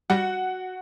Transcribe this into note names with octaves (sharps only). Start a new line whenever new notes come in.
G3 F#4 F#5